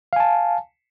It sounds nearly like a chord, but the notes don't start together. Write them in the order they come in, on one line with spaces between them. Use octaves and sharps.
F5 G#5 A5